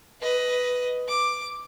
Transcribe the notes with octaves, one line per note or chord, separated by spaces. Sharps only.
B4 D#5
D6